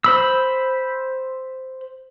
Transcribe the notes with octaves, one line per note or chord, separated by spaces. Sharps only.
C5 B5 E6